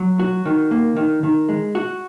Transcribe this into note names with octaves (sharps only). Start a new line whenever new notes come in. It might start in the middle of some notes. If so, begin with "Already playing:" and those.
Already playing: F#3
F#4
D#3
A#3
D#3
D#3
G#3
F#4